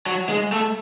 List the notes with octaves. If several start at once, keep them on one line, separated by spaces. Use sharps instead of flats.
F#3
G#3
A3